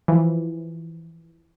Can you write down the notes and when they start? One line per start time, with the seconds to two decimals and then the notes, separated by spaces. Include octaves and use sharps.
0.08 E3 F3